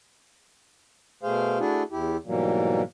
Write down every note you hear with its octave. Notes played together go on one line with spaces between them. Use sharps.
B2 A3 G#4 C5 F5
A3 D4 E4 F#4 G#4
E2 E4 G4
G#2 B2 E3 F#3 G3 A#3